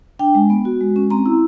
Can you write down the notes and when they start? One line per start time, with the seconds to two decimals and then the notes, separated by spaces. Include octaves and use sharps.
0.19 D4 G5
0.35 G#3
0.50 B3
0.65 F#4
0.80 G#3
0.96 C#4
1.10 C4 A#5
1.26 E4